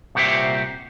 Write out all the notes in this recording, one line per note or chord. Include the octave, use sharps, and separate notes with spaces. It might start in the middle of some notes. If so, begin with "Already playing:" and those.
C2 A#2 F#4 G4 C5 E5